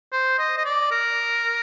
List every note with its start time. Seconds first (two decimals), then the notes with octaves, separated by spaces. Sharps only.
0.12 C5
0.39 D#5
0.58 D#5
0.65 D5
0.91 A#4